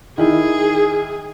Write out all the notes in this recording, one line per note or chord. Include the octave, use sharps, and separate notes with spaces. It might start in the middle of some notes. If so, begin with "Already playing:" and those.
D#3 E4 G#4